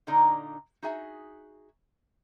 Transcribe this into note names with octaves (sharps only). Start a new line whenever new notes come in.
A#2 D3 A#3 D#4 D5 D#5
D#4 F#4 G#4 E5 G#5